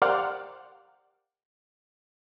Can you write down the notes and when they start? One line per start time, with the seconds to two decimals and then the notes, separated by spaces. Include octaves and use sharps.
0.02 G4 A#4 C5 D5 F5 F#5